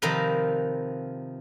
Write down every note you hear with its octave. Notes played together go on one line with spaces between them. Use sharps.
C3 D#3 F3 D#4 A#4 B4